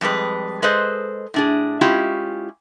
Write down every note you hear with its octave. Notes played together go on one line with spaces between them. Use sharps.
F2 G3 G#3 B4
G#3 G#4 A4 B4 C5 D#5
A2 D4 G#4
G#3 C#4 E4 F4 G4